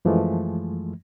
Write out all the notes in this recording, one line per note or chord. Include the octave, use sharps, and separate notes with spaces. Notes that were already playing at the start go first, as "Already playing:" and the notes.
F#2 E3 F3 G#3 A3